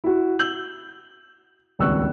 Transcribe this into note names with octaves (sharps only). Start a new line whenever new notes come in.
E4 F#4
E6 G6 F#7
D#1 G#1 C#2 C#6 E6 F#6